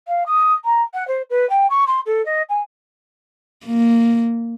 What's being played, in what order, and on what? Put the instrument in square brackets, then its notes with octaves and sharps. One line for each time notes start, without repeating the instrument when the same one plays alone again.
[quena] F5
D#6
A#5
F#5
C5
B4
G5
C#6
C6
A4
D#5
G#5
[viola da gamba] A#3